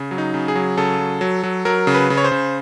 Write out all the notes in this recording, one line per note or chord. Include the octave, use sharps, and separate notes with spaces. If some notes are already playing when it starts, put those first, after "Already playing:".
Already playing: C#3
F#3
D#4
C#3
G#4
F#3
C#3 A4
F#3
F#3
F#3
F#3 A#4
C#3
B4
C#3
C#5
C5
C#3